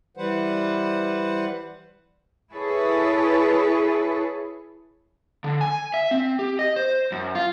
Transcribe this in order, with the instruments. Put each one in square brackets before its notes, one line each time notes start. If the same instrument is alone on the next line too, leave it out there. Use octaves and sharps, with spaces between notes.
[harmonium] E3 G3 B4 C5 F#5
[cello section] E4 G#4 A4 B4 C#5
[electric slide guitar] D3
G#5
E5
C4
G4
D#5
C5
F#2
F4